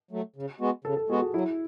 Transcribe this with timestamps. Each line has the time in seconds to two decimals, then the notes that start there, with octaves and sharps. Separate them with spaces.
0.11 F#3 A3
0.36 C#3
0.60 G#3 B3 F#4
0.84 C#3 A4
0.97 A4
1.09 G#3 B3 F#4 G#4
1.22 F#4
1.34 F#3 E4